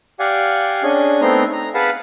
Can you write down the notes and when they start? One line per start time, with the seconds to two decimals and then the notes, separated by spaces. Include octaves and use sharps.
0.19 G4 D5 F5 F#5 G#5
0.83 C#4 D4 G#4 D#5 G#5
1.22 A3 B3 C4 D#4 A#5 C6
1.53 A#5
1.75 G#4 B4 F5 F#5 A5 B5